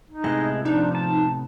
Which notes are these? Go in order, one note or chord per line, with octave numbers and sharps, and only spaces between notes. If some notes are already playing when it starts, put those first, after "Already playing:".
D#4
A2 C3 G#3 B3 E4 D#5
F3 D4 D#4
A5